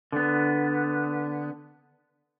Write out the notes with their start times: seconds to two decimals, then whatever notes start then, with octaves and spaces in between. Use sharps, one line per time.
0.12 D3 B3